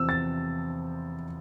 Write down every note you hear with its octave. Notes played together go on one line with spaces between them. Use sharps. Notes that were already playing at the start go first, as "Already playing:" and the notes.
Already playing: E2 C3 F3 C4 E6
A6